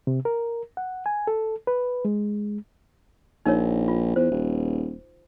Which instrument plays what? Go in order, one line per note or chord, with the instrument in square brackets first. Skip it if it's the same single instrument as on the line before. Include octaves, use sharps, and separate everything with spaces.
[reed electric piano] C3
A#4
F#5
G#5
A4
B4
G#3
[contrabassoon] A#1 [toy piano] D#4 A#4 C#5
[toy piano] F4
[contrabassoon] E2 [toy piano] C5
[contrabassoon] D#1